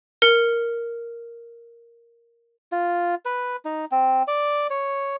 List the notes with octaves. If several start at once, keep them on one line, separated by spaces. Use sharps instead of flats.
A#4 C#7
F4
B4
D#4
C4
D5
C#5